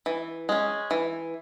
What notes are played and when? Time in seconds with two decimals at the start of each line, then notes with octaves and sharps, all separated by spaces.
0.06 E3
0.49 G#3 C#4
0.91 E3